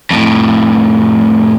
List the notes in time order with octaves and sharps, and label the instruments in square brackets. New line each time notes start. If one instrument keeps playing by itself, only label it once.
[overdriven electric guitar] F2 A2